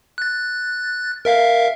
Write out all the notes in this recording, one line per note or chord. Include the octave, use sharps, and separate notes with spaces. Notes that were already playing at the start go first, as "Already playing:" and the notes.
F#6 A6
A#4 E5 F5